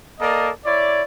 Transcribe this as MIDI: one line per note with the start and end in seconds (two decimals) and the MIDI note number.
0.20 0.50 58
0.20 0.50 69
0.20 0.50 70
0.20 0.50 74
0.20 0.50 75
0.65 1.02 64
0.65 1.02 73
0.65 1.02 74